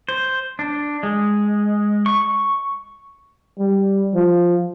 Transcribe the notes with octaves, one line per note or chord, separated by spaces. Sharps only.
C5
D4
G#3
C#6
G3
F3